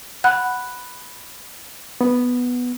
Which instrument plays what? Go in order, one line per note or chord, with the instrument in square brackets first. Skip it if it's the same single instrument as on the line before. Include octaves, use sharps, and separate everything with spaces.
[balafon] F#5 [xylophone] B5 F#6
[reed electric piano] B3